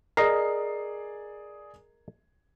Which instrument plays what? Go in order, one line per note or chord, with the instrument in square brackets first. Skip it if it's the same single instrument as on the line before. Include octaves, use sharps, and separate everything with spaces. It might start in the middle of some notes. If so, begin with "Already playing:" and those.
[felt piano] G#4 D5 C7 [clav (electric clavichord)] A#4 D#5